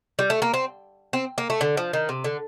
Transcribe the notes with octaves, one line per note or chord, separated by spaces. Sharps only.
G3
A3
A#3
C4
C4
A#3
A3
D3
F3
D#3
C3
D3